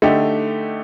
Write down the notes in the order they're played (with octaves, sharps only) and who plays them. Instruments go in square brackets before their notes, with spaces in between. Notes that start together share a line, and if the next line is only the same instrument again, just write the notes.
[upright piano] D3 A3 D#4 G4